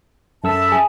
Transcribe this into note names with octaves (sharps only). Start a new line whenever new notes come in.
F#2 A4 E5 A5 B5 E6
G#4 G#5